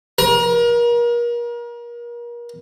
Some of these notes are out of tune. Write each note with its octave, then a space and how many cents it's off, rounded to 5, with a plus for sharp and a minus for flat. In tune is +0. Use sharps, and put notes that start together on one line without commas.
A#4 +35